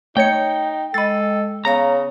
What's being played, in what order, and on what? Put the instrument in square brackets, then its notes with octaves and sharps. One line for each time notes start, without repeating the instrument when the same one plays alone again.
[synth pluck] A3 C#5 C#7 [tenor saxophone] D#4 [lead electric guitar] G5
[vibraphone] G#3 D#5 [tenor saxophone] A4 [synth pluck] B5 A6
[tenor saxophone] C#3 [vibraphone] B3 C#5 F5 [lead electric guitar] A#5